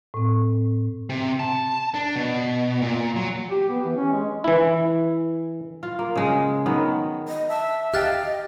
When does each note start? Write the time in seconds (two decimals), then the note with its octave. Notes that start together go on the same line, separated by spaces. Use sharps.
0.14 A2 C4
1.10 C3
1.40 A5
1.94 D4
2.15 B2
2.82 A#2
3.16 F#3
3.51 G4
3.69 B3
3.85 E3
3.97 C#4
4.13 G#3
4.44 E3 E4
5.83 F4
5.99 A#3
6.16 C#3 G#3
6.66 D#3 F#3 B3
7.28 D#5
7.48 E5 A5
7.94 G4 D#5 F5 G5 F6 F#6 A6